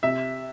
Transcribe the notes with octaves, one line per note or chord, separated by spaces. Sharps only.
C3 E5